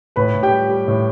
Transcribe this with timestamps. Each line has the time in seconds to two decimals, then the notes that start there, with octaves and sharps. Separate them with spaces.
0.16 A2 B4 B5
0.35 A2
0.43 G4 G5
0.51 G3
0.70 G3
0.88 A2